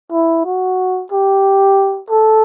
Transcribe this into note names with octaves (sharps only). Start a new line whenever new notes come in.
E4
F#4
G4
A4